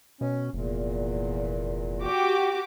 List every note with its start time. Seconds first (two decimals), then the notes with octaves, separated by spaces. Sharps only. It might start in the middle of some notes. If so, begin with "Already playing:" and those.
0.21 B2 C#4
0.53 F1 E2 A#2
2.02 F#4 G4 D6